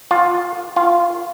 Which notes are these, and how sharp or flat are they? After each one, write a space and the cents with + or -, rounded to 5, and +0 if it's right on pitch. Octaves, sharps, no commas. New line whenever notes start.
F4 +10
F4 -15